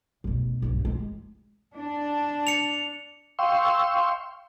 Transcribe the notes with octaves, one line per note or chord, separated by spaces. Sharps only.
F1 B2
B1 G2
E3 G#3
D4
C#7 F7
F5 G5 C6 C#6 E6